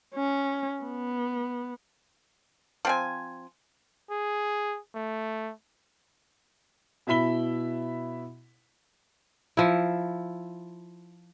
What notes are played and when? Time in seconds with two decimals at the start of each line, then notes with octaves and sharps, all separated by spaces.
0.15 C#4
0.84 B3
2.85 F3 C4 G#5
4.11 G#4
4.95 A3
7.07 B2 E4 E5 B5 B6 G7
9.57 F3 E4